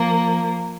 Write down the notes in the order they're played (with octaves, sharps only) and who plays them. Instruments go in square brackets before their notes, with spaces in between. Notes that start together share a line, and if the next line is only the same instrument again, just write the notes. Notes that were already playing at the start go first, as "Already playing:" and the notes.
Already playing: [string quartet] F3 A#3